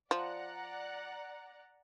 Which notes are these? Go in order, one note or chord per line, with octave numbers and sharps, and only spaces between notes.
F3 D5 F#5 A#5